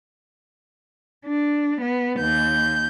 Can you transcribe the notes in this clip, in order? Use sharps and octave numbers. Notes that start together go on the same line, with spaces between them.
D4
B3
D#2 G6